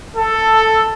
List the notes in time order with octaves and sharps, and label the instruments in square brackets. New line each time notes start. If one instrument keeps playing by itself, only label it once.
[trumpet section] A4